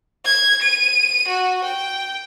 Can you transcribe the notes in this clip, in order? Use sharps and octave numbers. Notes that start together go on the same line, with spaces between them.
G#6
D#7
F#4
G5